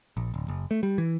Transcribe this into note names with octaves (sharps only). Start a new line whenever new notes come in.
A#1
D1
F#1
A3
G3
E3